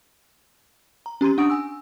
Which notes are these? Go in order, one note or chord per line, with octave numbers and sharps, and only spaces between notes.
A#5
C#4 G4 A#5 C6 D#7
D4 F#5 C#6 D#6 D7
G#5 E6